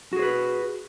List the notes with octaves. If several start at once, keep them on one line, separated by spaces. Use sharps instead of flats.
F#4 G#4 B4 C5